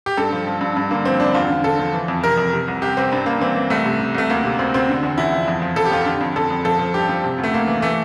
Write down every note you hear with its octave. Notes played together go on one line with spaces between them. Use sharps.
G4
G2 A4
F3
F3
G2
G2
D3 A#3
F3 C4
D3 D4
E2 F4
D3
D3 A4
F3
E3
F2
C3 A#4
F2
C3
C2
C2 G4
C2 C4
G2 C4
G2 A#3
E3 C4
E3
C2 A3
C3
C3
C2 A3
D2 A#3
C3
D2 C4
D2 C4
D3
E2
E2 E4
F3
F2
F3
F2 A4
G4
F2 F4
D3 G4
F2
F2 A4
F2
F3 A4
F3
G2 G4
F3
C3
D2
A3
D2 A#3
E3
E3 A3